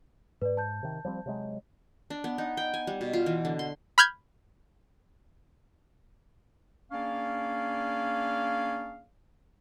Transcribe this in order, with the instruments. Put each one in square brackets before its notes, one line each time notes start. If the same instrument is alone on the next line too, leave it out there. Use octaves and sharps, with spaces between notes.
[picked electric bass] G#2 [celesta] B4 D5
[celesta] A5 G6
[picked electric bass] C3 D#3
F3 G3 C4
C3 F#3 G#3
[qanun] D4
B3
D#4
G5
G#5
G3
B2
F4
E3
D3
C6
[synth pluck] B5 F6 G6 G#6
[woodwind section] A#3 C#4 D4 G#4 D5 F5